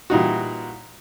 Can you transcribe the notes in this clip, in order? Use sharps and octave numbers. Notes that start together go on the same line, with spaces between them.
A#2 E3 G3 D#4 F4 F#4